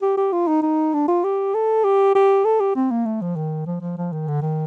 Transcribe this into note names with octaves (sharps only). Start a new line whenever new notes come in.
G4
G4
F4
D#4
D#4
D4
F4
G4
A4
G4
G4
A4
G4
C4
A#3
A3
F3
D#3
F3
F3
F3
D#3
D3
D#3